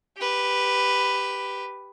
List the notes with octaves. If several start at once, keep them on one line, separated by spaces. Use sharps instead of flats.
G4 B4